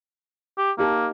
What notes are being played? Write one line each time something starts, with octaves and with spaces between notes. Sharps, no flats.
G4
A#3 D#4 G4 A5